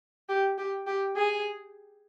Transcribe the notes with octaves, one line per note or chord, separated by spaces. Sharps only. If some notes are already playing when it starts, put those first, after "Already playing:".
G4
G4
G4
G#4